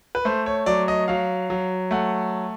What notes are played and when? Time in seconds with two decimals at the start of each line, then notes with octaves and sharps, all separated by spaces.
0.15 B4
0.25 A3 C5
0.46 C#5
0.66 F#3 D5
0.88 D#5
1.08 F#3 F5
1.50 F#3
1.91 A3 F#5